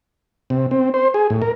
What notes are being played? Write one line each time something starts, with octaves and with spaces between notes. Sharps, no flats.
C3
C4
C5
G#4
A2
A#4